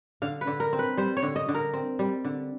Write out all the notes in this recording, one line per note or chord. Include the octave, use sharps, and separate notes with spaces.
D3 F5
B4
D3
A#4
C4
B4
G3 C5
C#5
D3
D#5
D3
A#4
C4
G3
D3